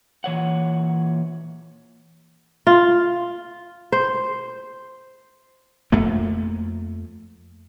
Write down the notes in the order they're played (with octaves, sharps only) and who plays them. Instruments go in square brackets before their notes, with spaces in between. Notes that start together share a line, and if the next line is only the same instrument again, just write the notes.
[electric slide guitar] A#2 E3 C#5 F#5
[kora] F4
C5
[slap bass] F2 A3 A#3